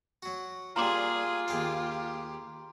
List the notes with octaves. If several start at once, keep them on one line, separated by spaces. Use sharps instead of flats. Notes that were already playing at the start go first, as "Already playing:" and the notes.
F#3 F#4
A#2 G3 F4 G#4 A#5 C6 D6
D#2 G4 G#4 F5